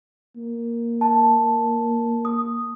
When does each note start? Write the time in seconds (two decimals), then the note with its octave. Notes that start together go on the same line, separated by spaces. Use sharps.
0.36 A#3
1.01 A5
2.25 D#6